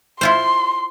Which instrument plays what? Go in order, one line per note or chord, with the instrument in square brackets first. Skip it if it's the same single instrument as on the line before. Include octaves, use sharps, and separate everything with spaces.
[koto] E4 F4 C5 [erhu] C6